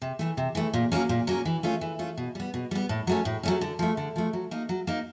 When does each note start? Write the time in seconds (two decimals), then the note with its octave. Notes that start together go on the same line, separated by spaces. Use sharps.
0.02 C3
0.19 E3 A3
0.37 C3
0.55 E3 A3
0.73 A#2
0.92 F#3 A#3 C#4
1.09 A#2
1.27 F#3 A#3 C#4
1.45 E3
1.63 A3 C#4 F4
1.81 E3
1.99 A3 C#4 F4
2.17 B2
2.35 G3 B3
2.54 B2
2.71 G3 B3
2.89 A2
3.07 F#3 A3 C#4
3.25 A2
3.43 F#3 A3 C#4
3.61 D3
3.79 F3 A3
3.97 D3
4.16 F3 A3
4.33 F#3
4.51 A#3 D#4
4.69 F#3
4.87 A#3 D#4